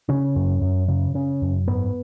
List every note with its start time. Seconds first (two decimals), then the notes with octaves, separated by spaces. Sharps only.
0.09 C#3 C#4
0.36 F#2
0.62 F#2
0.88 C#3
1.14 C#3 C#4
1.42 F#2
1.68 G#2 B3